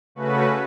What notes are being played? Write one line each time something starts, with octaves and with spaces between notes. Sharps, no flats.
C#3 A3 C#4 F#4 B4